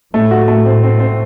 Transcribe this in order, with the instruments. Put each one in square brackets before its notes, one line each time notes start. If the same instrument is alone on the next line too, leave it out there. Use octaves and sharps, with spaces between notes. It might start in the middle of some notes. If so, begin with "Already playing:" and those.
[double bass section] A2 [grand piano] A3
[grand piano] F#4
A3
C4
C4
C4